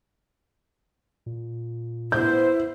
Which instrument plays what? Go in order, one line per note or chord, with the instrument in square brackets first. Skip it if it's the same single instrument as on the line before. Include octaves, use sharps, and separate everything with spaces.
[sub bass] A#2
[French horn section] B3 C5 [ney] E4 [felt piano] G6